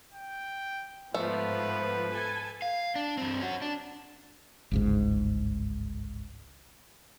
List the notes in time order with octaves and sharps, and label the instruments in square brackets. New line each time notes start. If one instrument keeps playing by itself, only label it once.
[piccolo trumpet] G5
[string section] G#2 F3 B3 [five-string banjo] A3 [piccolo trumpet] B4
[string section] A4 G#5
[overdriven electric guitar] F5
D4
G2 C4
C#4 F#4
D4
[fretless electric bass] G1 C#2 G#2